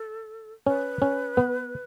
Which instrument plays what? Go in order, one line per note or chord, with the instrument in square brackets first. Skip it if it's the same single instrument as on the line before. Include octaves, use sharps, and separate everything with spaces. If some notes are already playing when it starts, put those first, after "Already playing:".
Already playing: [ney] A4
[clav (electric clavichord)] C#4 [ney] B4
[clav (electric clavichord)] C#4
B3